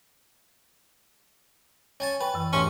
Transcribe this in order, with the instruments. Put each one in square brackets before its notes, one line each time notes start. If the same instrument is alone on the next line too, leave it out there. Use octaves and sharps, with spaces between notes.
[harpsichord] C#4 G#5 A5
[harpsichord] B4 [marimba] G5 C#6
[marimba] F#2 E3
[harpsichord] A1 E2 C#6 [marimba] G#2 C6 [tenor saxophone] C#4